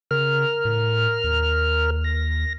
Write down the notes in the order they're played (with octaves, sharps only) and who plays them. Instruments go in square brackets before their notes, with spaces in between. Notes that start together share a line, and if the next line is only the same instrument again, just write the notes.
[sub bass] C#3 [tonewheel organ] A#4 F6
[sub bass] A2
D#2
[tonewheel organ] A#6